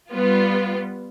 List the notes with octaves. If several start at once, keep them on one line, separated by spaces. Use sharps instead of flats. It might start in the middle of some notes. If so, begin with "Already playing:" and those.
G3 B3 F4